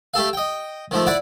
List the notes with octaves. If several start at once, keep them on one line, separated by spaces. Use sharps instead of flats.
A3 G4 A4 F5
D#5 G5
D#3 F3 A3
E4 D5 F#5 D6